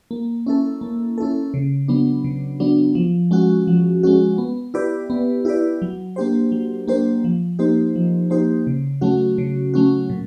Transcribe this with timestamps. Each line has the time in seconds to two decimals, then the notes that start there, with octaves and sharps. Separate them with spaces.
0.11 A#3
0.47 C#4 E4 A4
0.81 A#3
1.18 C#4 E4 A4
1.54 C#3
1.88 F#3 B3 D4
2.24 C#3
2.60 F#3 B3 D4
2.95 F3
3.31 G#3 C#4 F#4
3.67 F3
4.03 G#3 C#4 F#4
4.38 B3
4.74 E4 G4 B4 D5
5.10 B3
5.45 E4 G4 B4 D5
5.82 F#3
6.16 A#3 D4 G4 C5
6.52 F#3
6.87 A#3 D4 G4 C5
7.24 F3
7.59 A#3 D#4 G4 C5
7.96 F3
8.30 A#3 D#4 G4 C5
8.67 C#3
9.01 F#3 A3 C#4 F#4
9.38 C#3
9.74 F#3 A3 C#4 F#4
10.10 A#2